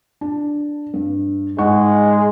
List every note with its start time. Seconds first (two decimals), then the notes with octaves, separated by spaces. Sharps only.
0.21 D4
0.94 G2
1.58 G#2 G#3 F#5 C#6